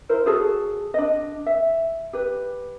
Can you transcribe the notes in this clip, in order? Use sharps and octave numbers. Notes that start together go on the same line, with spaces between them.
E4 A#4 C5
F#4 G#4 A4 C#5
D4 D#5
E5
G4 B4